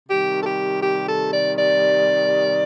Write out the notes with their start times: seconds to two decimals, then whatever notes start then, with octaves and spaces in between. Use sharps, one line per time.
0.09 C3 D#3 G3 G4
0.41 A4
0.46 G4
0.82 G4
1.08 A4
1.32 D5
1.57 D5